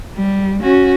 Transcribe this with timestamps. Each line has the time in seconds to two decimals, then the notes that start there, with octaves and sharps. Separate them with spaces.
0.16 G3
0.62 C#4 F#4